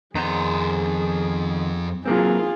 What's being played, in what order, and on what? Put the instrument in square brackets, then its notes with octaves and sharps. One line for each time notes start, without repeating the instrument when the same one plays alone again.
[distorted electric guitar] F2 A#5 [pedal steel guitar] D#3 B3 C5 [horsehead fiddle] G#4
[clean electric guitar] F#3 A#3 C4 [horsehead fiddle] F4 G#4